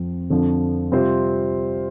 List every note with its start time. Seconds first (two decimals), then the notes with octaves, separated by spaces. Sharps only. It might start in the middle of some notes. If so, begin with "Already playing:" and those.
Already playing: F2 F3 C4
0.30 F2 D3 F3
0.91 C3 G3 C4 F4 C5